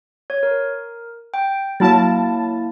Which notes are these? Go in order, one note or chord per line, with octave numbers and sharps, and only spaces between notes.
C#5
A#4
G5
F#3 A#3 E4 A5 A6